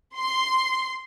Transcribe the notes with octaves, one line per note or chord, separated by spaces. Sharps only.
C6